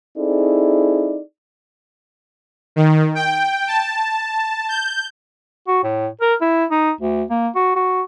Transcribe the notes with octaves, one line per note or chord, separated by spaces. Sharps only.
C4 D#4 E4 G#4 A4 D5
D#3
G5
A5
G6
F#4
A2
A#4
E4
D#4
D2
A#3
F#4
F#4